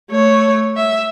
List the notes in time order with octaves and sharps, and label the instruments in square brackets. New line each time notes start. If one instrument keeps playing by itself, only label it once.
[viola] A3 C#5
E5